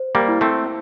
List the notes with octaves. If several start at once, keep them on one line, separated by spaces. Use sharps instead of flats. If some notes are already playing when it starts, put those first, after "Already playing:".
Already playing: C5
G3 A#3
E4
A3 C4